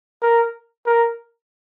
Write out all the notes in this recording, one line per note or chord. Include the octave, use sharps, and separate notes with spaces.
A#4
A#4